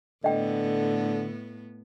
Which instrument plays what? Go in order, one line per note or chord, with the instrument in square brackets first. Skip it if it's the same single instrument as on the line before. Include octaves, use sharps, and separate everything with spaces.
[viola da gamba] A2 B3 [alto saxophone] D3 [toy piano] D#5 G5